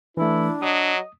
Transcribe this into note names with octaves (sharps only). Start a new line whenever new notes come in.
E3 A3 D4 E4
F#3 D#5 D#6